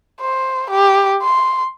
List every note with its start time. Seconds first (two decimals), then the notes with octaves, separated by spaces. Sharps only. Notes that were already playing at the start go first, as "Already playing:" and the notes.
0.21 C5
0.71 G4
1.23 C6